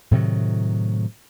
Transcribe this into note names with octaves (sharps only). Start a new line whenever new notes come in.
A2 C3 D#3 F#3